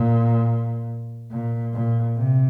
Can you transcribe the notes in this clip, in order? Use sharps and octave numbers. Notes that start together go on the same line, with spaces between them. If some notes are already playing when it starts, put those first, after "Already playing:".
Already playing: A#2
A#2
A#2
C3